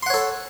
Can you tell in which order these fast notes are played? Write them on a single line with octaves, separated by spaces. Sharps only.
C6 F#5 C#5 A4